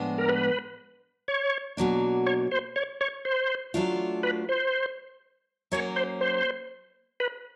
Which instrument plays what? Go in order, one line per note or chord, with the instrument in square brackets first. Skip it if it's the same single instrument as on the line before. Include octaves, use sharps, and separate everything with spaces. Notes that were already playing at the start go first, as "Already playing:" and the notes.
Already playing: [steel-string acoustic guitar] A2 F3 G#3 B3 D4
[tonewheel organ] A#4
B4
C#5
[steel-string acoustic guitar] B2 F#3 A#3 D4
[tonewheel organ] C#5
C5
C#5
C#5
C5
[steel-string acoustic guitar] F#3 A3 D4 F4
[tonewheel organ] B4
C5
[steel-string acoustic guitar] F#3 A#3 C#4 [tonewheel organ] C#5
[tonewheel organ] C5
C5
B4